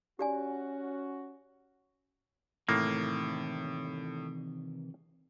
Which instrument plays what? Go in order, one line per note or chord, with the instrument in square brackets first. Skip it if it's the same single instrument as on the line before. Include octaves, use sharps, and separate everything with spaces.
[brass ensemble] C#4 F#4 [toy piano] G4 D5 G#5
[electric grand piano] A2 [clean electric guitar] C3 D#3 E3 [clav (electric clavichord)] A#3